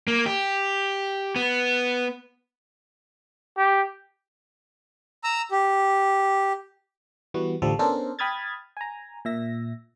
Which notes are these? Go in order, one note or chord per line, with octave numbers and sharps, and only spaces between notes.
A#3
G4
B3
G4
A#5 E6
G4
E3 G3 B3 F#4
A1 D2 F3 G3 A4
B3 C#4 D4 A4 A#4 C5
G5 B5 D#6 F6 G#6 A6
G#5 A#5
A#2 E5 A#6